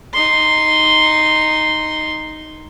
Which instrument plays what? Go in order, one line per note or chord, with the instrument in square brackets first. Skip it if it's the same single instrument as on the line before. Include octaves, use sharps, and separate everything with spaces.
[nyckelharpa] D#4 C6